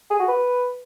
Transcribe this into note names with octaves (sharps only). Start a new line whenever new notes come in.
G#4
F#4
B4